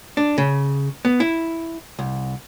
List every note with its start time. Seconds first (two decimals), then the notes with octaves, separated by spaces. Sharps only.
0.17 D4
0.38 C#3
1.05 B3
1.20 E4
1.99 C2